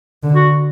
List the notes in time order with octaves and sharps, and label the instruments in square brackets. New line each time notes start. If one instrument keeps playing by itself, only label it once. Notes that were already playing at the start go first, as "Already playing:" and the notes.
[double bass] D3
[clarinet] F#4